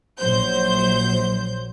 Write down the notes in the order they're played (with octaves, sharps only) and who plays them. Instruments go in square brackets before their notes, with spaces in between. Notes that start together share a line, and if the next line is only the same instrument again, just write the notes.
[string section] A#1 F#3 C5 G6